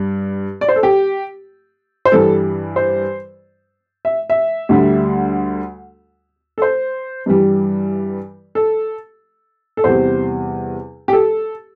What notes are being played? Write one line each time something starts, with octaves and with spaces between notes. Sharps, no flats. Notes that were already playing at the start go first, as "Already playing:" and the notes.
Already playing: G2 G3
D5
C5
A4
G4
C5
G2 E3 G3 A4
C5
E5
E5
D2 D3 G3
A4
C5
G2 E3 G3
A4
A4
E2 C3 G3 C5
G4
A4